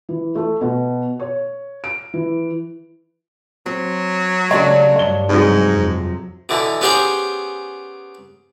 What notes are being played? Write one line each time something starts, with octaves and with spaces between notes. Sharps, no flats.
E3
A3
B2
C#5
D7
E3
F#3 C4
C#3 A3 D4 G4 C#5 D5 F5
G2 C#5 G7
G#2 C3 F#3
F2
B2 D3 E3
B3 C#4 G4 G#4 C5 A#5